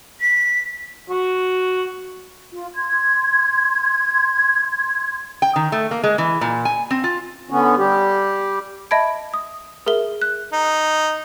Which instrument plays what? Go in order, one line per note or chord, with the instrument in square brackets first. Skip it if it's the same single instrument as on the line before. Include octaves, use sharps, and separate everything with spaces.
[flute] B6
[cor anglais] F#4
[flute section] F4
C6 G#6
[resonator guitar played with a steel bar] G5
D#3
A3
A#3
G#3
E3
A#2
G#5
C4
F4
[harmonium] D3 B3 C#4
G3 G4
[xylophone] D#5 E5 A5 B5 G#6 D7
D#6
G#4 A#4 E5 G7
F#6
[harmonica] D#4